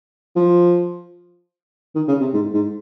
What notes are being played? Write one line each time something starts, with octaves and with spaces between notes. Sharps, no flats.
F3
D#3
C#3
C3
G#2
G#2